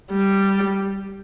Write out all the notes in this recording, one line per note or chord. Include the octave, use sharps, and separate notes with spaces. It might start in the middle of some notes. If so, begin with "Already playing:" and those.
G3